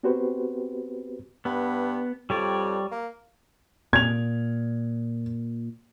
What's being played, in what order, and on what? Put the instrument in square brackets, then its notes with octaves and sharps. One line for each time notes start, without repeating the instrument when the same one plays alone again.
[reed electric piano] B3 C4 F#4 G4 B4 C5
[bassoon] G2 [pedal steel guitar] B3
[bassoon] F2 [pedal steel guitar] G3 C#5 D5
[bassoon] A#3
[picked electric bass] A#2 [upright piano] G#6 F7